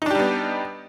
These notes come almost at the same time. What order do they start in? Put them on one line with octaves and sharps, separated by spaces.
D#4 D4 G4 G3 B3